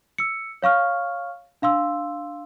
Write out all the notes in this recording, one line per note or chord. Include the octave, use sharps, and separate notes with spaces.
E6 C#7
C#5 F5 C#6 F6
D4 F5 C6 E6